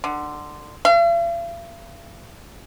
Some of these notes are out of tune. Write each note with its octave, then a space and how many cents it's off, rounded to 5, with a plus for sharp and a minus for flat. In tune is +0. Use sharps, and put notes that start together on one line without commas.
D3 +20
F5 -45